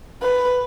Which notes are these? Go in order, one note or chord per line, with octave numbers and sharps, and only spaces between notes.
B4